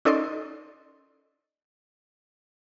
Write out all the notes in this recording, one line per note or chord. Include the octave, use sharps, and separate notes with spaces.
C#4 D#4 A4 D5 D#5 C6